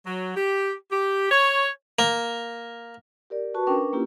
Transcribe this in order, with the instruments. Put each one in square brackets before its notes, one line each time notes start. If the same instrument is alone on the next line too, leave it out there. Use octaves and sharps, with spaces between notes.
[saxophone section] F#3
G4
G4
C#5
[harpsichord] A#3
[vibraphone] G4 A#4 D5
F#4 B4 A5 C#6
C#4 D4 A#4 B4 G5 C#6
A#3 C#4 E4 F4 G4